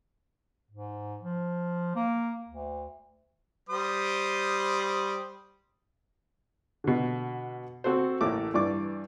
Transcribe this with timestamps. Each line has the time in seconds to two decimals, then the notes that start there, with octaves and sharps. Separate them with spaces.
0.70 G#2
1.21 F3
1.96 A#3
2.49 D2
3.69 G3 C5 D#6
6.84 B2 D3
7.84 C4 F#4 A4 C5
8.21 A1 A2 A#3 A4 D6
8.54 G2 E3 D5 C#6 D6